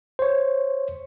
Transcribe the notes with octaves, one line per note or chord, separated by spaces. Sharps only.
C5 C#5